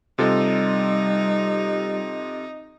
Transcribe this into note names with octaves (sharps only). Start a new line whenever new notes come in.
C3 G3 D#4 F4 A4